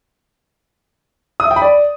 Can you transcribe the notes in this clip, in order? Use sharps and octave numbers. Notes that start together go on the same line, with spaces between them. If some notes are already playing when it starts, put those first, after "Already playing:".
D#6
E5
G5
B5
D5